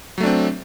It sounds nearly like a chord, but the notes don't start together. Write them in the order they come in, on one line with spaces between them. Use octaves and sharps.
F#3 A3 D4 C4